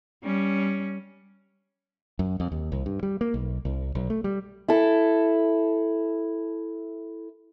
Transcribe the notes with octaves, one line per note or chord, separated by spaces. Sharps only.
G3 C#4
F#2
F2
D#2
C2
G2
G3
A#3
B1
C2
B1
A3
G3
E4 A4